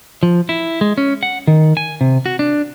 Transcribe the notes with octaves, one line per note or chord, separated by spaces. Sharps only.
F3
E4
G#3
C#4
F#5
D#3
G#5
C3
F#4
D4